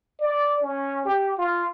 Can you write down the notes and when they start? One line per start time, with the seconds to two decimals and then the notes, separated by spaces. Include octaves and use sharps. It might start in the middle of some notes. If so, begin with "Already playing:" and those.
0.20 D5
0.62 C#4
1.05 G4
1.38 F4